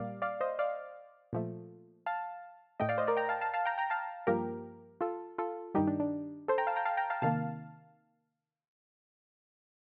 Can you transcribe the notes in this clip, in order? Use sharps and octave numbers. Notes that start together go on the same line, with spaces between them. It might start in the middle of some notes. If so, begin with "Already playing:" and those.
Already playing: A#2 G3 A#3 D5 F5
D5 F5
C5 D#5
D5 F5
A#2 F3 A3
F5 A5
A2 A3 D#5 G5
D5 F5
C5 D#5
A#4 D5
G5 A#5
F5 A5
F5 A5
F5 A5
G5 A#5
G5 A#5
F5 A5
G2 F3 A#3 G4 A#4
F4 A4
F4 A4
G2 D#3 G3 D#4 G4
D4
D4
A4 C5
G5 A#5
F5 A5
G5 A#5
F5 A5
G5 A#5
F5 A5
C3 D#3 A#3 F5 A5